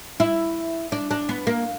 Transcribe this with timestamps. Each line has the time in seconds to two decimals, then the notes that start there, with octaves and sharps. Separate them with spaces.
0.20 E4
0.92 D4
1.11 D4
1.29 B3
1.47 A#3